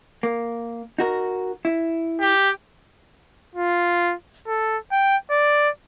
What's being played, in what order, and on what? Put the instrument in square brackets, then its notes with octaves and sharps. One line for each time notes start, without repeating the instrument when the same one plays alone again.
[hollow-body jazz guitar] A#3
D#4 F#4 A#4
E4
[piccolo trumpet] G4
F4
A4
G5
D5